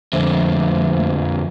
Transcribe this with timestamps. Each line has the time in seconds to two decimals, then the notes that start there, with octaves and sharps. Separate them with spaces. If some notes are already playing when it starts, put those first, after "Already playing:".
0.13 F2 D3 F3 A3